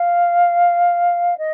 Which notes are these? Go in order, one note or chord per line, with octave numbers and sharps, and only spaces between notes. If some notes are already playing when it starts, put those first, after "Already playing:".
Already playing: F5
D#5